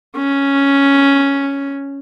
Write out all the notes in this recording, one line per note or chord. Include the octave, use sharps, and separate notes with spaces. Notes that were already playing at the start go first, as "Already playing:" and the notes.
C#4